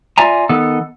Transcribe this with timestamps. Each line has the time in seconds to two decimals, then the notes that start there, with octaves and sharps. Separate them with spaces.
0.18 F4 D5 E5 G#5 A#5
0.49 D#3 B3 A4